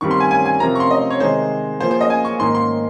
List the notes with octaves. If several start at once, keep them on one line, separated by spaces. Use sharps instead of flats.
G2 D#3 G3 C4 G4 C#6
C6
G#5
G#5
G#5
C3 F3 C4 G4 A#4 A#5
C#6
C6
D#5
C#5
C3 D#3 G#3 D#4 C5
F3 A#3 F4 G#4 C5
C5
D#5
G#5
C#6
G#2 D#3 A#3 D#4 C6
C6